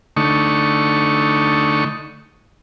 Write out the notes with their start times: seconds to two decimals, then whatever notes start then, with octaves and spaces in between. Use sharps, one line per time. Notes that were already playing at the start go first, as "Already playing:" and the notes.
0.17 D3 A3 D#4 C#6